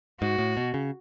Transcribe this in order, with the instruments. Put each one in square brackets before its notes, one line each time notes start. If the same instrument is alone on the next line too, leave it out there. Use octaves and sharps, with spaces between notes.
[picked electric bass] G#2 [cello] F#4
[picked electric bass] A2
B2
C#3